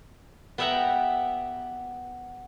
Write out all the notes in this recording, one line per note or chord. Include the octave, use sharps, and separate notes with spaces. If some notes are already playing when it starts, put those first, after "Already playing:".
B3 G4 E5 F#5 G5 A#5